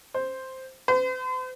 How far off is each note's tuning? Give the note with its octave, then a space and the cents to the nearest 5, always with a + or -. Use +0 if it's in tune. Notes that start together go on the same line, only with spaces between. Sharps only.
C5 +0
C5 -45